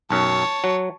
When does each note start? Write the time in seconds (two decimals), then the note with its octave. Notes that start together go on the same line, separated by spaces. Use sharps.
0.10 B1 F#2 C#5 A5
0.64 F#3